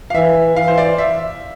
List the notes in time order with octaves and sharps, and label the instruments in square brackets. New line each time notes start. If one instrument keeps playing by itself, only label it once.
[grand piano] F5
[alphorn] E3 [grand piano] E5
[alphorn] E3 [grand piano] F5
[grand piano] C5
D5
E5